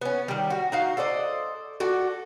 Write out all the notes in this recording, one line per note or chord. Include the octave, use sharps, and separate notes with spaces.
B3 C#4
D#3 G3
F#4
D#4 F#4 F5
A4 C5 D5 D#5
F#4 A4 D5